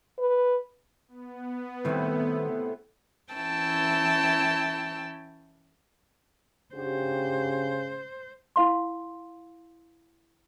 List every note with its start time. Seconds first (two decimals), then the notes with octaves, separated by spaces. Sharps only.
0.18 B4
1.08 B3
1.85 A2 C3 D#3 G3 C4
3.32 E3 C#4 E4 G5 A5 E6
6.75 C#3 D4 F#4 G4 C5
8.56 E4 F5 C6